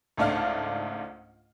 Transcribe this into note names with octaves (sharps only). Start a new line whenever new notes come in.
C#2 G#2 A3 D4 F5 F6